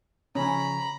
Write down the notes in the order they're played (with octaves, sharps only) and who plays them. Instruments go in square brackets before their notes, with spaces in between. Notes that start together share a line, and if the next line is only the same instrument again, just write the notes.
[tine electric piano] C#3 F3 [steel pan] C#4 [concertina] A#5 [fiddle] B5